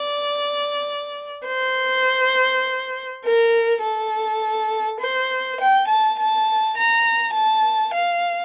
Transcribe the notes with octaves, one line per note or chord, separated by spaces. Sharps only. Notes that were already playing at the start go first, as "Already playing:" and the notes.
Already playing: D5
C5
A#4
A4
C5
G5
A5
A5
A#5
A5
F5